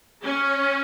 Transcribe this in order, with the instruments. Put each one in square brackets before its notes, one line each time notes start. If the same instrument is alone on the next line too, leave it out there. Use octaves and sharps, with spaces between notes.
[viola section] C#4